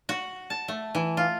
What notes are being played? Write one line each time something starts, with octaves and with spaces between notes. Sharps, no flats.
F#4
A5
A3
E3
F4